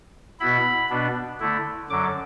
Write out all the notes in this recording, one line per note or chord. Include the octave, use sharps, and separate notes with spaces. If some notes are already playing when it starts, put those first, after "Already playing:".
B2 B3 E4 B5
B2 B3 D4
D3 A3 E4
F#2 D3 F#3 D6